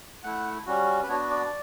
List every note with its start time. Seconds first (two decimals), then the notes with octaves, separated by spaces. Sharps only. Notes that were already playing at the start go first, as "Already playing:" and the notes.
0.24 A3 E4 F#5
0.66 G3 C#4 F#4
1.03 B4
1.09 B3 D4 F#4 C#5
1.30 D5